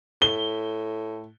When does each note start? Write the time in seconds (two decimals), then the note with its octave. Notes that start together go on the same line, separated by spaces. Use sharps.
0.22 A2 G7